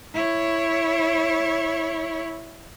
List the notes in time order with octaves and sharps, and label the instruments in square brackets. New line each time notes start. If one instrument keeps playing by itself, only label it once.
[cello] E4 C#5